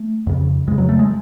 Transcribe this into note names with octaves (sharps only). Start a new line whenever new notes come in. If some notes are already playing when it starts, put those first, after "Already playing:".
Already playing: A3
F2 C#3
F2 C#3 G#3
F#3
A3
G#3